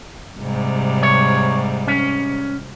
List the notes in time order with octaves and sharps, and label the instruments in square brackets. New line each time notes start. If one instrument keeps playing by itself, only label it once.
[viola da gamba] G#2 C3 G3
[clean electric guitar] C#5
C#4